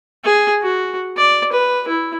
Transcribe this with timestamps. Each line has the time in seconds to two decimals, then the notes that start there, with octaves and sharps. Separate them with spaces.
0.24 G#4
0.63 F#4
1.17 D5
1.52 B4
1.88 E4